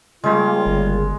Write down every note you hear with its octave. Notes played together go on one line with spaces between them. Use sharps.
C#3 G3 G#3 A#3 F4
G1